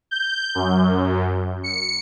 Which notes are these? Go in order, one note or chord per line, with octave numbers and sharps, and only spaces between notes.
G6
F#2
C#7